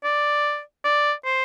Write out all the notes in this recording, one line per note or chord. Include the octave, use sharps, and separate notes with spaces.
D5
D5
C5